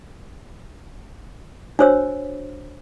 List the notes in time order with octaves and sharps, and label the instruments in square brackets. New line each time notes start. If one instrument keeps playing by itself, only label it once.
[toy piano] D4 F#4 C5 C#5 E6